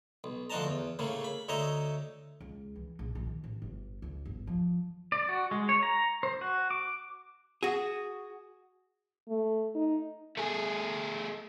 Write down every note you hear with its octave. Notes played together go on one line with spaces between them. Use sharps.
B1
D2 F3 F#4 D#5 A5 A#5
E2
A2 C#3 A3 A#3
B5
D2 D#4 C#5 D#5 E5 A#5
C#2
E3
A#1
A#1
D#3
A1
G1
C#2
G1
F3
D5
F#4
G#3
C#5
A#5
C5
F#4
D6
F#4 G#4
A3
D#4
A3 G#4